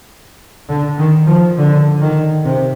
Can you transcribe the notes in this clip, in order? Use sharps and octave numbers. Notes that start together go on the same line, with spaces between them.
D3
D#3
F3
D3
D#3
C3